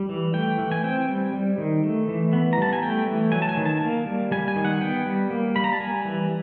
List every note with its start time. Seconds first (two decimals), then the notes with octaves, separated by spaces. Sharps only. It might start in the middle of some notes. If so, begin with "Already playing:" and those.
Already playing: G3
0.09 E3
0.34 A3 G5
0.59 E3
0.72 G#5
0.84 C4 G5
1.08 G3
1.33 G3
1.58 D#3
1.84 A3
2.08 E3
2.33 B3
2.53 A#5
2.58 G3 A5
2.73 G#5
2.83 A3 G5
3.07 E3
3.32 F#3 G#5
3.42 A5
3.49 G#5
3.57 D#3
3.66 A5
3.81 A#3
4.06 G3
4.32 G3 G#5
4.48 G#5
4.56 D#3
4.65 F#5
4.81 B3 G5
5.06 G3
5.31 A#3
5.56 G3 B5
5.64 A#5
5.73 A5
5.80 G3 G#5
6.05 E3